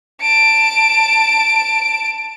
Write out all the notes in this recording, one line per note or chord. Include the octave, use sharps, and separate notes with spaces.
A5 D7